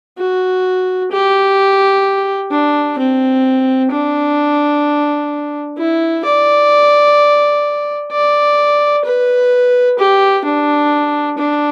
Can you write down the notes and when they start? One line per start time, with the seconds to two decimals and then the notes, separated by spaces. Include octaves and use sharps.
0.18 F#4
1.11 G4
2.51 D4
2.98 C4
3.91 D4
5.78 E4
6.25 D5
8.11 D5
9.04 B4
9.99 G4
10.45 D4
11.38 D4